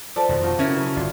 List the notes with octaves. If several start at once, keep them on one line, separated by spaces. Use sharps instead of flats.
F3 A4 B4 D5
F2 B2 D#3
D4 D#4 F4 F#4
C#3 C#4 E4 A#4
F#3 A3 B3
G1 D4 F4 E5